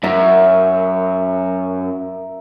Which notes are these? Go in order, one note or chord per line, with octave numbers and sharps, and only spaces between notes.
F#2 A#4 E5